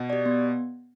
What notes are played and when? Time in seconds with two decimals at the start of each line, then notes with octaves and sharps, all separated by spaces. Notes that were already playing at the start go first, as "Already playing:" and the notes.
Already playing: B2
0.10 G4 D5
0.26 B3